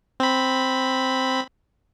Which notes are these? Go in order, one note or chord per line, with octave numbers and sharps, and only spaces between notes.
C4 B5